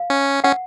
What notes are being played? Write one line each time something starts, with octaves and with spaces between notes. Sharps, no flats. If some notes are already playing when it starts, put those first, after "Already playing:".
Already playing: F5
C#4
C#4 F#5